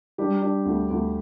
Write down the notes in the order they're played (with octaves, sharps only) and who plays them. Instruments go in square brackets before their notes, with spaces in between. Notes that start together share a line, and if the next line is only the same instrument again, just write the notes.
[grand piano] G3 G4 [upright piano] D4
[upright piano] D4
D2
D2